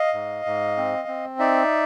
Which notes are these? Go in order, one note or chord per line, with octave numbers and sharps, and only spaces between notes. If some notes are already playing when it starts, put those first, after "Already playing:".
Already playing: D#5 F5
G#2
G#2
C4
C4
D#4 D5 E5